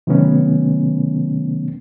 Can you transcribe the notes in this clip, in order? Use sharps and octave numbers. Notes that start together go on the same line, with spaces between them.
C3 D#3 F#3 A3 B3 C#4